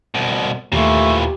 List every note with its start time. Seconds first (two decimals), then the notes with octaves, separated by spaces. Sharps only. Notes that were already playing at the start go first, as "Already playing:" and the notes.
0.15 C2 B2
0.72 D#2 A#2 E3 A3 G4